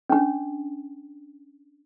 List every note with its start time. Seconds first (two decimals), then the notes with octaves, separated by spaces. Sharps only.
0.10 C#4 D4